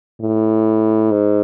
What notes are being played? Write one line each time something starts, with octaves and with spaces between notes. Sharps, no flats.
A2
G#2